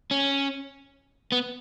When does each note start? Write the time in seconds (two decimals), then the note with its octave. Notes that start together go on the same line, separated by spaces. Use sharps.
0.11 C#4
1.32 B3